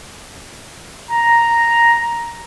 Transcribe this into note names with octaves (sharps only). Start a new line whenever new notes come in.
A#5